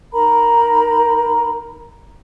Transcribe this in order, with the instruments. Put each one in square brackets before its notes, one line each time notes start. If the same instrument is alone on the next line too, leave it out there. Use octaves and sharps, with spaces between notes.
[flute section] D#4 A#4 A#5 B5